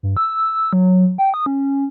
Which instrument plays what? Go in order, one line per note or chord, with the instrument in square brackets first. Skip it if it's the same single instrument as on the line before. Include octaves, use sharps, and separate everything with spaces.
[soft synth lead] G2
E6
F#3
G5
D#6
C#4